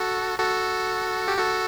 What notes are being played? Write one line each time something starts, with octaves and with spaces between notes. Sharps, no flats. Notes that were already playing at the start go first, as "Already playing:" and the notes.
Already playing: F#4 A4
F#4 A4
G4
F#4 A4